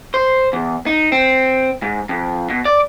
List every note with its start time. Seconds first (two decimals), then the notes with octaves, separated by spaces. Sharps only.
0.14 C5
0.53 E2
0.86 D#4
1.12 C4
1.82 G#2
2.09 F2
2.50 B2
2.65 D5